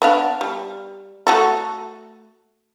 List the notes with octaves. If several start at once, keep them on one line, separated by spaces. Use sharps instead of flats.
B3 D4 F5
G3
A3 F#4 A4